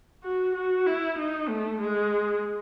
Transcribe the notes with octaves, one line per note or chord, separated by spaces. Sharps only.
F#4
F#4
E4
D#4
A3
G#3